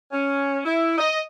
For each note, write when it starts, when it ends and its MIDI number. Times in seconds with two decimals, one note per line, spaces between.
0.12 0.60 61
0.65 0.96 64
0.98 1.20 75